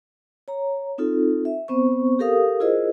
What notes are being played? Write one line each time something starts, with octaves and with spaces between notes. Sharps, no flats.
C#5 A#5
C4 D#4 F4 A4
E5
B3 C4 C5 C#6
G4 A4 A#4 F5 D#6
E4 F4 G#4 A#4 C5 D#5